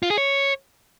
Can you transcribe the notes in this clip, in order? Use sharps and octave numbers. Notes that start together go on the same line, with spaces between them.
F4
G#4
C#5